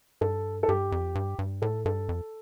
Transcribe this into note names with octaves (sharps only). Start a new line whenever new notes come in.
G2 A4
A4
G2 G4
F2
G2
G2
A2 A4
G2 A4
F2